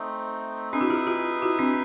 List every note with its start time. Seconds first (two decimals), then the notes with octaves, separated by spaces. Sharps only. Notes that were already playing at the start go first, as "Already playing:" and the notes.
Already playing: A3 C4 D#4
0.72 C4 D4 D#4 G#4 B4 E5
0.81 E4 F#4
0.90 F4 G4
1.06 F4 G4
1.42 E4 F#4
1.59 C4 D4